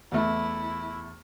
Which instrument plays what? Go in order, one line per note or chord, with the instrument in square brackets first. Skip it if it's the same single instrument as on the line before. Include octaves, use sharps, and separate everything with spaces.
[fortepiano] E2 A3 [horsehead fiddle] E4